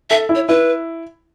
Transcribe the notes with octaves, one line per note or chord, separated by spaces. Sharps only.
A4 E5
E4
C#5
E4 B4